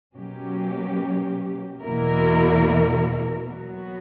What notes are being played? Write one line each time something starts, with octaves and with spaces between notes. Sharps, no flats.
B2 F#3 A#3 C#4 G4
E2 B2 A#3 E4 A#4
F#3 B3 F#4